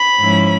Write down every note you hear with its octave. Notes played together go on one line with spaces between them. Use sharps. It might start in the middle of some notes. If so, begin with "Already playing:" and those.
Already playing: B5
G#2 F3 G#3 C#4 E4